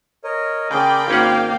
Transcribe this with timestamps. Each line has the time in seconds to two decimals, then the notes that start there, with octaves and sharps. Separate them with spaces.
0.24 A#4 C#5 D#5
0.71 C#3 G#4 A#4 D5 G5 B5 C6
1.08 G#1 A#3 C#4 F5 F#5